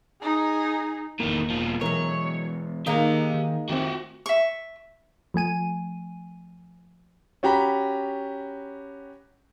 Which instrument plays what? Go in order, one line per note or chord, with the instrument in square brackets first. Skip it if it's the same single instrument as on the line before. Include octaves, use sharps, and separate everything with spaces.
[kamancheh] D#4 G#4
[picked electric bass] E1 A#3 [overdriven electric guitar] A2 D#3
[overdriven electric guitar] B2 F3
[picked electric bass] B2 E3 G#3 [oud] F#3 A#4 [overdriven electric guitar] C#5
[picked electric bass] D#3 [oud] G#3 A#3 D#4 [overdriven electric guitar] G4 A#5
[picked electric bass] D#3
[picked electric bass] D#3 A3 C4 [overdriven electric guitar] F#4 G4
[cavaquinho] E5 C#6
[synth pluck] F3 A3 G#5 D#7
[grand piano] C#4 F#4 G4 A#5 B5